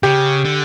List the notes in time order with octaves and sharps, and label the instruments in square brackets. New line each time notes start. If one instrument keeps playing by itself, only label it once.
[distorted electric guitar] C#3 [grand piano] G4
[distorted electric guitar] D3